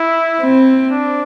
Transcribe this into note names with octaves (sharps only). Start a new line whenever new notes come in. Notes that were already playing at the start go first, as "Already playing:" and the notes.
Already playing: E4
C4
D4